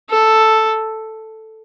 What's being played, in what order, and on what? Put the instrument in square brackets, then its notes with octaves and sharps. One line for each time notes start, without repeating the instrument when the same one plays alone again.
[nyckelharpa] A4